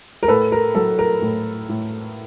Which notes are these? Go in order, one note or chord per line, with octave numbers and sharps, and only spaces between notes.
A#4
A2 A4 B4
A#4
F#3 A4
A#4
A2
A2